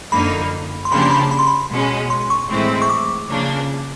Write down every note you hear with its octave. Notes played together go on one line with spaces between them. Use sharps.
F#2 D3 F3 A#3 D#4 B5
C6
C#3 F3 A#3 D4 G4 B5
C6
B5
B5
C6
B5
B2 G#3 C#4
C6
C#6
A2 E3 G#3 C4 E4
C#6
D6
C#3 F3 A#3 D4